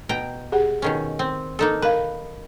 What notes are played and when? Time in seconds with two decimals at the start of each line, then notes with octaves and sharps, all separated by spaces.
0.09 B2 G5 A#5
0.52 G4 G#4 F#5
0.82 B2 D#3 C#4
1.19 C4
1.59 A#3 D#4 A4
1.82 A#4 B4 F5